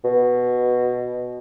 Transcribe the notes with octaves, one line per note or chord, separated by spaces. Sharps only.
B2